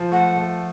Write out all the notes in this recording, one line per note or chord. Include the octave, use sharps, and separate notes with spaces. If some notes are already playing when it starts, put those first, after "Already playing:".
Already playing: F3
A3 F#5
A3